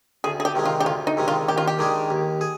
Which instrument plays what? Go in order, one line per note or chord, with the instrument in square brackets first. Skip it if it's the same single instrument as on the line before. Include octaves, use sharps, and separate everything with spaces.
[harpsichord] D2 [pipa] G#4
[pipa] G#4
G4
[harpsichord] C3 D#3 G#3
[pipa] F4
G4
[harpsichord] D2 [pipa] F4
[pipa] D#4
[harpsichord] C3 D#3 G#3
[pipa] F4
[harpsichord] D#2 [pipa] G4
[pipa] F4
G4
[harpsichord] D#3 G#3 D4 G#4
D#2
G#4